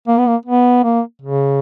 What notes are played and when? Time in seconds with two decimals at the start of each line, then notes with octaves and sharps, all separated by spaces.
0.08 A#3
0.18 B3
0.27 A#3
0.46 B3
0.84 A#3
1.22 C#3